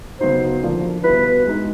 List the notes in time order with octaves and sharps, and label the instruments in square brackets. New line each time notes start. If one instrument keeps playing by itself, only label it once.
[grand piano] C#3 F#3 B3 D#4 F#4 [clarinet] C5
[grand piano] D3 F3 A#3
[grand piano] B2 G3 B3 E4 [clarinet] B4
[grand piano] G#3 B3 D#4